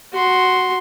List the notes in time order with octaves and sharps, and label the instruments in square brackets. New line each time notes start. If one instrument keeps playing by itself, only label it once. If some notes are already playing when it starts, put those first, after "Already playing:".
[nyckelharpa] F#4 C6